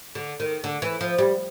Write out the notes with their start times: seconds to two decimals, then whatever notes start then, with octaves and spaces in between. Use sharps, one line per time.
0.15 D3
0.40 D#3
0.64 D3
0.82 E3
1.01 F3
1.19 G3